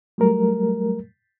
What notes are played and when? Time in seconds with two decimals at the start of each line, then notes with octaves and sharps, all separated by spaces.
0.18 F#3 G3 A3 A#4